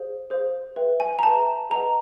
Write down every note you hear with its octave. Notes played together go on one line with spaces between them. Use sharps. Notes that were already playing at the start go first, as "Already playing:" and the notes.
Already playing: G#4 C5 F5
G#4 C5 F5
G#4 B4 E5 G5
G#5
A#5
G#4 B4 E5 G5 A5
G#4 B4 D#5 F#5 A#5